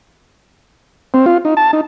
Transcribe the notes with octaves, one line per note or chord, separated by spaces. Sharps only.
C4
F4
D#4
A5
D#4